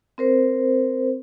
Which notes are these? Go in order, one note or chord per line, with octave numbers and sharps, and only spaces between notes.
C4 A#4 C5